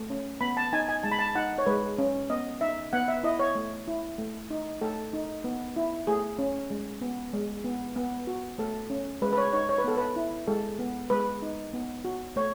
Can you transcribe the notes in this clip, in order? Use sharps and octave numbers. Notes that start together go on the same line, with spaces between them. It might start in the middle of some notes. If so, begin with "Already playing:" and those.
Already playing: A3
C#4
B3 B5
A5
D#4 G#5
G#5
G#3 A5
B5
A5
D#4 F#5
C#5
G#3 B4
C#4
B3 D#5
D#4 E5
B3 F#5
E5
E4 D#5
C#5
A3
E4
A3
D#4
A3 A4
D#4
B3
E4
A3 G#4
C#4
G#3
B3
G#3
B3
B3
F#4
A3 A4
C#4
G#3 B4
B4
C#5
D#4 C#5
C#5
B4
B3 A4
B4
E4
G#3 A4
B3
G#3 B4
D#4
B3
F#4
A3 C#5